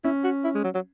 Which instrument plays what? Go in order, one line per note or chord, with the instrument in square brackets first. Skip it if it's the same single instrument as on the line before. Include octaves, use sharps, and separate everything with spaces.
[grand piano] C#4 [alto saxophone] E4
[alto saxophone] F#4
E4
G#3
F#3
F#3